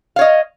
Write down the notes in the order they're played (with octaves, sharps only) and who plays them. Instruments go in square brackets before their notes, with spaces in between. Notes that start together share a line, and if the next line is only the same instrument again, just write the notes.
[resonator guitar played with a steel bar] F5
C#5
D#5